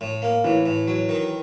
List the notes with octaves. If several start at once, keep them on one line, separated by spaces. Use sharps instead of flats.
A2
A#3
A2 E3
A2
F#3
D#3